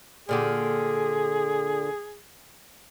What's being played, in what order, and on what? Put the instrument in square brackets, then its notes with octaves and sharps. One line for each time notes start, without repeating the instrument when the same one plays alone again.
[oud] A#2 D3 G4 [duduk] G#4